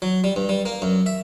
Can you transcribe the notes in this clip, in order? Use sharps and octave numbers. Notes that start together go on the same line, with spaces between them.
F#3
G3
G2
G3
A#3
F#2
E5